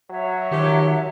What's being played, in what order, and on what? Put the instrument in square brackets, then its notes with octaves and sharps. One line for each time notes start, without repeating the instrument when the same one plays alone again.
[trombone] F#3 [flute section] C#5 E5
[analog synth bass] D#3 [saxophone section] F3 G4